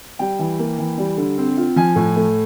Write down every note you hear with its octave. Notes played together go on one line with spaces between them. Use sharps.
G3 G5
E3
A#3
E3
G3
D3
C4
F4
F3 G#5
A2
A3